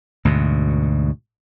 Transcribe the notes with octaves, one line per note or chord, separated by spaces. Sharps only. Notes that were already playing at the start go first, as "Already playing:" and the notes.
D2 G#2 B2